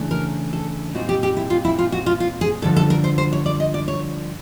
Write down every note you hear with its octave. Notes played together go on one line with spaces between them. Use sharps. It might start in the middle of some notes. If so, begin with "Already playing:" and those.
Already playing: C#3 E3 A3 D4
A#4
A4
A#2 G3 C4 D#4 F#4
G4
G4
E4
F4
E4
F4
F#4
F4
F4
G#4
G2 D3 F3 A4
A4
A#4
C5
C5
C#5
D5
D#5
D5
C#5